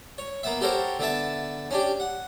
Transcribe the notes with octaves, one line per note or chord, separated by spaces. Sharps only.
C#5
A#3 B3 E5
F#4 G4 A4 A#4 C5 C#5
D3 B3 E5 A5
C#4 D4 G4
F#5